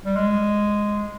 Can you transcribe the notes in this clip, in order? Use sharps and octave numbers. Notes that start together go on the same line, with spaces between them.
G3
G#3